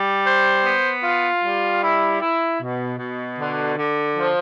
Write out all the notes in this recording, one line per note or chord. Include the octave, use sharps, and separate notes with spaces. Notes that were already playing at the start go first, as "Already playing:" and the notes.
Already playing: G3
C5
B3
F4
G3
E4
E4
B2
B2
D3
D3
F3